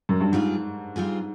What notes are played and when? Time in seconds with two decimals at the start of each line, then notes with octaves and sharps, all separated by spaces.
0.09 F#2
0.21 G2
0.32 G#2 G3 C4 F4 G#4
0.96 G3 C4 F4 G#4